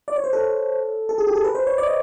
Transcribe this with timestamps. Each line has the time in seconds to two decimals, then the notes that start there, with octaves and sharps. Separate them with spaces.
0.08 D5
0.16 C#5
0.24 C5
0.33 A4
1.09 A4
1.18 G#4
1.27 G4
1.35 A4
1.44 B4
1.55 C5
1.67 C#5
1.78 D5
1.87 D#5